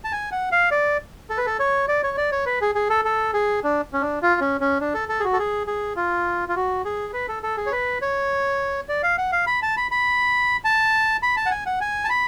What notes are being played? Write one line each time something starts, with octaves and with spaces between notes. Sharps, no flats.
A5
G#5
F#5
F5
D5
A4
B4
A4
C#5
D5
C#5
D5
C#5
B4
G#4
G#4
A4
A4
G#4
D4
C#4
D4
F4
C#4
C#4
D4
A4
A4
G#4
F#4
A4
G#4
G#4
F4
F4
F#4
G#4
B4
A4
A4
G#4
C#5
B4
C#5
D5
F5
F#5
F5
B5
A5
B5
B5
A5
B5
A5
F#5
G#5
F#5
G#5
A5
B5